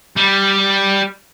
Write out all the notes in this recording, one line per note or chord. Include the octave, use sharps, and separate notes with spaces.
G3